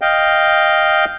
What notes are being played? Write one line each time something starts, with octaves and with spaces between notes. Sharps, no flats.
D#5 F5 G5